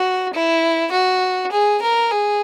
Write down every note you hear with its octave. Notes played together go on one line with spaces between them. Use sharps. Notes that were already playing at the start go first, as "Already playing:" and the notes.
Already playing: F#4
E4
F#4
G#4
A#4
G#4